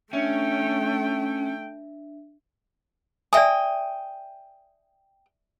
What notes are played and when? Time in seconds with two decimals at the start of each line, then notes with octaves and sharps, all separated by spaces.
0.13 A3 C#4 D4 E5 G5
3.33 D5 E5 G5 G#5 D#6